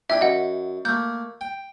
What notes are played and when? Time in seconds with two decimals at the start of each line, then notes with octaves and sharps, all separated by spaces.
0.10 D4 E4 E5 G5
0.21 F#2 D#5 F#5
0.85 A3 A#3 G6
1.41 G5